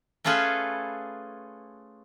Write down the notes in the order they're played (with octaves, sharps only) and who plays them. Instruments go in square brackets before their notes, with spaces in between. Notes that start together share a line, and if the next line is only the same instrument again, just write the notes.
[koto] A3 C#4 F4 G#4 A4 B4